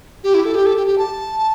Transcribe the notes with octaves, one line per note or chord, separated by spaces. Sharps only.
G4
E4
A4
G4
A4
G4
G4
A5